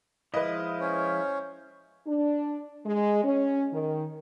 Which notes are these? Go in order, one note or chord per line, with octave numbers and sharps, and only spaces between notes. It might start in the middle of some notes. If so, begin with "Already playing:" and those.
F3 G#3 E4 B4 D#5
C#4 C5 C#5
D4
G#3
C#4
D#3